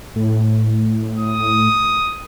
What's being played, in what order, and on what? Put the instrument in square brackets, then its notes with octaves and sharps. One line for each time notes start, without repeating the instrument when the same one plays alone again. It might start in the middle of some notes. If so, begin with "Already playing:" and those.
[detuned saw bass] A2
[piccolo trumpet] D#6